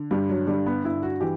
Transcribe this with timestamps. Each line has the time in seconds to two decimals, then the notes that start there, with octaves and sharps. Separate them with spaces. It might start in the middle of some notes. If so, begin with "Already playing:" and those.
Already playing: D3
0.11 G2 G3
0.29 F#3
0.47 D3 G3
0.66 B3
0.84 G2 E4
1.03 F#4
1.21 E3 G4